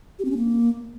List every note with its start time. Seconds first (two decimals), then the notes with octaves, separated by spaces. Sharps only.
0.19 G4
0.25 C4
0.31 C#4
0.37 A#3